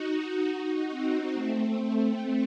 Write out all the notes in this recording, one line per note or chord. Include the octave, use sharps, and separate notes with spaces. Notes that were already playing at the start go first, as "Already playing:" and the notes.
Already playing: D#4 F#4
D#4 F#4
C4 D#4
A3 C4